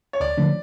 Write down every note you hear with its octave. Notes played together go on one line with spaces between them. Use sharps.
C#5
D2 D5
D3 F3 A3 D4